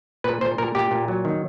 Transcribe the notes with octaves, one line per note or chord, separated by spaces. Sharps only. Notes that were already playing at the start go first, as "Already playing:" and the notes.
A#2 B4
A#2 C5
A#2 A#4
A#2 G4
A#2
F#3
D#3